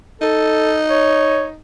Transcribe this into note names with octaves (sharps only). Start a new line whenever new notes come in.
D#4 A4
C#5